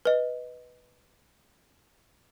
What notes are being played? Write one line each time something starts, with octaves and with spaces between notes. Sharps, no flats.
B4 D#5